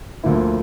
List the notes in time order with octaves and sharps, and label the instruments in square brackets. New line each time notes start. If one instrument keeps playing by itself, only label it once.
[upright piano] D2 D3 F3 A#3 E4